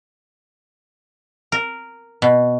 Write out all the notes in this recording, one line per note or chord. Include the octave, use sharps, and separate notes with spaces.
A#4
B2